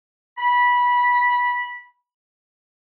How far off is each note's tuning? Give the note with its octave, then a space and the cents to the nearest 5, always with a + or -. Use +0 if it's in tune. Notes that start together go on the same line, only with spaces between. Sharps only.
B5 -15